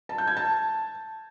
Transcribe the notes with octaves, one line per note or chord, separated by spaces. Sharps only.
A5
G6
G#6
A5